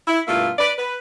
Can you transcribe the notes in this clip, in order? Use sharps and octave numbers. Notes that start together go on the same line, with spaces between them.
E4
G2 B2 A3 A#3 E4 F4
B4 D5
B4